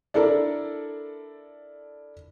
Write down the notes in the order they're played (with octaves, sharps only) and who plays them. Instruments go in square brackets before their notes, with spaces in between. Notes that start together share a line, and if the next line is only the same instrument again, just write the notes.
[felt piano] D4 E4 A4 A#4 D5